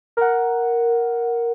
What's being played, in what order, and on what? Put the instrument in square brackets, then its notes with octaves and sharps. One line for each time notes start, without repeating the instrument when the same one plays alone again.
[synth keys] A#4 F#5